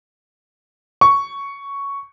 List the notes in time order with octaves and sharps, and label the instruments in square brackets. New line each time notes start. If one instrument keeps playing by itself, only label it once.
[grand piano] C#6